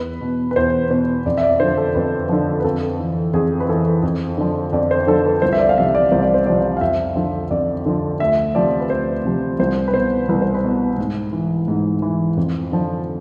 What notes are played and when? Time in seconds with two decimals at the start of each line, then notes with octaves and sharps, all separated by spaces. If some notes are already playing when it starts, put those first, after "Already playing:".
Already playing: E2 B4
0.21 B2
0.51 B4
0.56 E2 C5
0.91 B2 C5
1.26 F2 D5
1.37 E5
1.43 D5
1.60 D3 F3 C5
1.77 A4
1.95 F2 B4
2.29 D3 F3
2.60 B4
2.64 F2 A4
3.00 E3
3.33 F2 G#4
3.60 B4
3.69 E3 A4
4.03 F2
4.38 D3 F3
4.73 F2 D5
4.91 C5
5.07 D3 F3 A4
5.25 B4
5.42 C2 C5
5.53 E5
5.59 D5
5.69 F5
5.78 C3 F3 E5
5.95 D5
6.12 C2 C5
6.22 D5
6.34 C5
6.46 C3 F3 D5
6.77 F5
6.81 F2 E5
7.16 D3 F3
7.51 F2 D5
7.86 D3 F3
8.20 D2 E5
8.55 C3 F3 D5
8.80 B4
8.89 D2 C5
9.25 C3 F3
9.59 C2 C5
9.88 B4
9.94 B2 C5
10.29 C2 B4
10.42 C5
10.55 B4
10.64 B2
10.98 G#2
11.33 E3
11.68 G#2
12.02 E3
12.37 F2
12.72 D3 F3